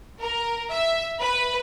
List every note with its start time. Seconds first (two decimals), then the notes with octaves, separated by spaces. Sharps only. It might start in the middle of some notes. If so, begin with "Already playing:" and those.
0.21 A#4
0.70 E5
1.20 B4